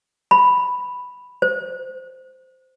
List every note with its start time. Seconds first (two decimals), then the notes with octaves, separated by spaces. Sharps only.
0.31 B5
1.42 C5